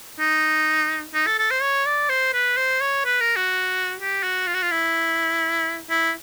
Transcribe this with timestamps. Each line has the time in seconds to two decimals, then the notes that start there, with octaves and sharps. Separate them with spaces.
0.20 D#4
1.14 D#4
1.27 A4
1.38 A4
1.51 C5
1.62 C#5
1.86 D5
2.10 C5
2.33 B4
2.57 C5
2.81 C#5
3.05 B4
3.21 A#4
3.36 F#4
4.00 G4
4.23 F#4
4.47 F4
4.55 F#4
4.62 F4
4.71 E4
5.90 E4